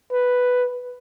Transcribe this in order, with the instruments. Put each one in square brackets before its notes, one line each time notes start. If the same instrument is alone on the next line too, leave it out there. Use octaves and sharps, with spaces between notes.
[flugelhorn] B4